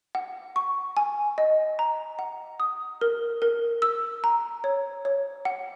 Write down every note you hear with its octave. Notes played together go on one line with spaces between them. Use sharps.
F#5
C#6
G#5
D#5
A#5
F#5
D#6
A#4
A#4
E6
A#5
C#5
C#5
F#5